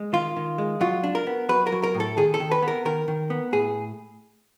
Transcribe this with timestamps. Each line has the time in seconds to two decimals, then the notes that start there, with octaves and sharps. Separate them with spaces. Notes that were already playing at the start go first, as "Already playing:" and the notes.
Already playing: G#3
0.13 D#3 F4
0.36 D#3
0.58 G#3
0.81 F#3 F4
1.03 D4
1.15 A#4
1.27 B3
1.49 F#3 B4
1.67 A#4
1.72 F#3
1.83 A#4
1.94 A2
2.00 A4
2.17 D#3 G#4
2.34 A4
2.40 D#3
2.51 B4
2.62 B3
2.68 A#4
2.85 D#3 A#4
3.08 D#3
3.30 B3
3.52 A2 G#4